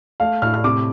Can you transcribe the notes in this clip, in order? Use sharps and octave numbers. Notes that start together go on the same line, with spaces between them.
A3 F5
A2 F6
F6
C3 D6